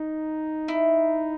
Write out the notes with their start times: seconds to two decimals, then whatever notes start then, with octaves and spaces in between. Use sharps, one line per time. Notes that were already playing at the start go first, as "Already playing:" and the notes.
Already playing: D#4
0.68 E4